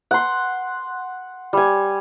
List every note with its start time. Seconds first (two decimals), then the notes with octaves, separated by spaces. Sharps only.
0.11 F#5 C6
1.53 G3 G#5